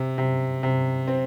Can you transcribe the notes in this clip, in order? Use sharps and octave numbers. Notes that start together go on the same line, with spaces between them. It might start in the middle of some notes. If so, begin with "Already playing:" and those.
Already playing: C3
C3
C3
C4